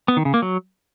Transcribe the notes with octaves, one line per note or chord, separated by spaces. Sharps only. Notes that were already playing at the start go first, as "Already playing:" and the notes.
B3
D#3
C#3
A#3
F#3